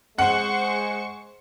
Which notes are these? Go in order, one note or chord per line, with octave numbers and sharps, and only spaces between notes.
G#3 C5 F#5 C#6